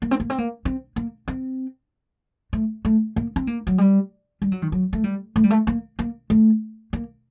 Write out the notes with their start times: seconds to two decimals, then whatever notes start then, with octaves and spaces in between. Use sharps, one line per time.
0.02 A#3
0.11 C4
0.20 A#3
0.30 C4
0.38 A#3
0.65 C4
0.96 A#3
1.28 C4
2.53 A3
2.85 A3
3.16 A#3
3.36 C4
3.47 A#3
3.67 F#3
3.78 G3
4.42 G3
4.52 F#3
4.62 D#3
4.72 F#3
4.93 A3
5.04 G3
5.36 A3
5.44 G3
5.50 A3
5.67 A#3
5.99 A#3
6.30 A3
6.93 A#3